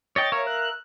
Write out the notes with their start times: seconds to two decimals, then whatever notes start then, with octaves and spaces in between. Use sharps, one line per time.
0.16 C#5 D#5 G5 A6
0.32 A#4 C#5 E5 F5
0.47 F#6